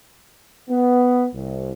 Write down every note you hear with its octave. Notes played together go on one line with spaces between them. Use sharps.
B3
C2